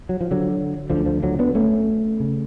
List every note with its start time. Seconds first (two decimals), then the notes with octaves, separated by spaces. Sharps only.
0.09 F#3
0.21 F3
0.31 D3 F#3
0.90 D2 D3 F3
1.06 F3
1.23 D3 F#3
1.39 B3 D4
1.55 A3 C#4
2.20 C#3